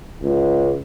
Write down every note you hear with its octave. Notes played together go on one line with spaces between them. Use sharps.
C#2